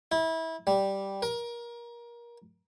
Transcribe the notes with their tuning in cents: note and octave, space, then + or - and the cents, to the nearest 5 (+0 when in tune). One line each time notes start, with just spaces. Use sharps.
E4 -25
G3 -5
A#4 +25